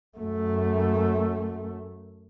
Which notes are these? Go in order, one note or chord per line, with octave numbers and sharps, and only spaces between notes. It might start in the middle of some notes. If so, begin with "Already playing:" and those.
F#2 A3